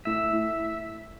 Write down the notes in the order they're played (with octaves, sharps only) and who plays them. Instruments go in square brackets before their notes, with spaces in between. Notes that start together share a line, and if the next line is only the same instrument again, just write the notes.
[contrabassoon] A2 [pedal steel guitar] E5
[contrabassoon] A2